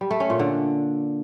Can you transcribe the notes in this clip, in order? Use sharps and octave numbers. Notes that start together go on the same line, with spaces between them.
G3
A3
C#4
A#2
D3